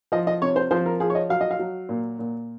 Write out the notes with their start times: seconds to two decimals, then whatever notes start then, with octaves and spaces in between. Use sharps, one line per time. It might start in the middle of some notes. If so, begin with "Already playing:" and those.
0.12 F3 D#5
0.27 D#5
0.42 C3 C#5
0.56 C5
0.71 F3 C5
0.86 A#4
1.00 F3 G#4
1.10 C#5
1.15 D#5
1.29 F#3 F5
1.41 D#5
1.51 F5
1.59 F#3
1.89 A#2
2.19 A#2